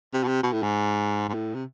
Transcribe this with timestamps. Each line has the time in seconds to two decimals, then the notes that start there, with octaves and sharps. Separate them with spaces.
0.13 C3
0.23 B2
0.28 C3
0.43 B2
0.53 A2
0.63 G#2
1.29 G#2
1.34 A2
1.54 C3